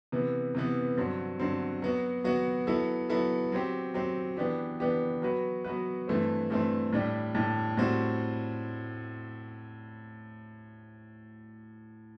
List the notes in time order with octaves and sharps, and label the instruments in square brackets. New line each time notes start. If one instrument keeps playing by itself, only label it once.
[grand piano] C3 E3 B3
C3 E3 B3
G2 D3 F#3 C4
G2 D3 F#3 C4
F#3 B3 F#4
F#3 B3 F#4
F#3 B3 E4 A4
F#3 B3 E4 A4
F#3 C4 G4
F#3 C4 G4
E3 B3 D4 G4
E3 B3 D4 G4
F#3 B3 F#4 B4
F#3 B3 F#4 B4
G2 E3 A3 C4
G2 E3 A3 C4
A2 G3 D4 G4
A2 G3 D4 G4
A2 G3 C4 F#4